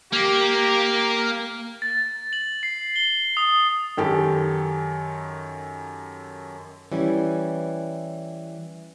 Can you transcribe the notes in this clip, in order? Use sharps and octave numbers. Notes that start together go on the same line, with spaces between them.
A#3 G4
A6
F#7
C7
G7
D#6
F#2 D#3 G4 A4
E3 G3 C#4